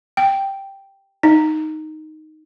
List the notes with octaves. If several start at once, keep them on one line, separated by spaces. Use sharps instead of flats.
G5
D#4